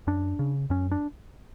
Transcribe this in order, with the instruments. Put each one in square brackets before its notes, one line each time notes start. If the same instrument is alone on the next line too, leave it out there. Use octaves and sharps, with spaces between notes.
[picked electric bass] F#2 D4
C#3
F#2 C#4
D4